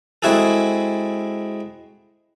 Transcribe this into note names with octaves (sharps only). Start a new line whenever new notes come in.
G#3 C4 E4 F#4 G#4 A4